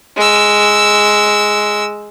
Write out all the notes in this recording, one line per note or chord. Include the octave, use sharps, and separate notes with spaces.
G#3 E6